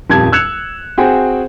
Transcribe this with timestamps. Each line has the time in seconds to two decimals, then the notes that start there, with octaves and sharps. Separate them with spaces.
0.10 D#1 F2 G4 A5 G#6
0.32 E6 F#6 G#6 C#7 E7 F7
0.98 C4 F#4 G#4 G5 G#5